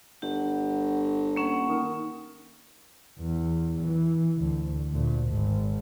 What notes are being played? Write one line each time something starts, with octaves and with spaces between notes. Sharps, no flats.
G1 G4 F#5
A#3 C#4 F#5
D#3
E2
E3
D2
D2 A#2
G#1 G#2